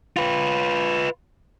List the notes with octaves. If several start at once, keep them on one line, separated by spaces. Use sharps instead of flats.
F4 B4